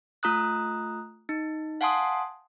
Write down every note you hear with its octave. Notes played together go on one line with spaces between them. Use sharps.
A3 F4 A#5 D#6 F#6
D#4
F5 F#5 G#5 A5 C6 D#6